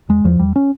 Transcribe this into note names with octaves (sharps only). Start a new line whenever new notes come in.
E2 G#3
E2 F3
E2 G3
C#4